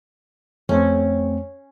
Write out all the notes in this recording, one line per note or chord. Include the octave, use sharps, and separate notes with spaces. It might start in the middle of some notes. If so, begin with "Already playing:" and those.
F2 A3 C4 C#4